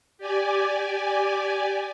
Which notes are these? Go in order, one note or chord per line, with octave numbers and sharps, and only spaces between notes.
G4 D5 G#5